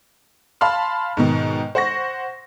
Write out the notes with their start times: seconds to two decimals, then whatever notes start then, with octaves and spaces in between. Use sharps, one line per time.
0.61 F5 A5 B5 C6 F6
1.17 G#2 B2 D#3
1.75 C5 F#5 C#6 A#6